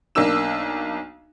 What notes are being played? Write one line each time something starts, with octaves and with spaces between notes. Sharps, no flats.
B1 A#3 D4 E6 E7